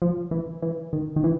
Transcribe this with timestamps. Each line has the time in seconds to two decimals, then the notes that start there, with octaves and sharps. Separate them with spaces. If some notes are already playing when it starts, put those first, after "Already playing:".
0.02 F3
0.31 E3
0.62 E3
0.93 D#3
1.16 D#3
1.24 E3